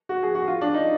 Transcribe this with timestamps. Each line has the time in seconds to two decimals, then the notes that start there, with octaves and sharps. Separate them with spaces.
0.09 F#4
0.23 G#4
0.35 F#4
0.48 F4
0.61 D4
0.74 D#4